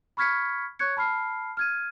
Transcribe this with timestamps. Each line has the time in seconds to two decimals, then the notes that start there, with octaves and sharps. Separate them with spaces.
0.17 B5 C#6 F6 G#6 B6 C#7
0.79 C#5 C#6 F#6 G#6 C#7
0.97 A5 B5 F6 C7
1.57 F6 G#6 D#7